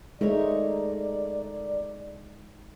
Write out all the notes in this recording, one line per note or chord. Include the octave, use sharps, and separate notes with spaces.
G#3 A3 D#4 A#4 C#5 D5